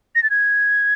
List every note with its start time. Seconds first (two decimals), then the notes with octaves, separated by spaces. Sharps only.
0.15 A#6
0.23 A6
0.30 G#6